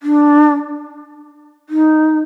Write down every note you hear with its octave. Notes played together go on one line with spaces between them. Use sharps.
D4
D#4